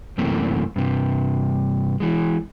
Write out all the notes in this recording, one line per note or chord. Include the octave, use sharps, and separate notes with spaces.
F#2 C3 E3 A3 A#3 C4
G2 C3
E3 G#3